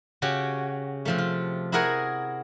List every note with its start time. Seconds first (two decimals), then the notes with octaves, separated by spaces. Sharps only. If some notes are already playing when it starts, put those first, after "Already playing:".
0.22 C#3 C#4 F#4 G4
1.05 C3 F3 A3
1.18 F4
1.72 E4 F#4 G#4 A#4 F#5 G#5